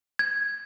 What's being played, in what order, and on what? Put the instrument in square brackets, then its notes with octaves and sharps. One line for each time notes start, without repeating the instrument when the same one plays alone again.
[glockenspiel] G#6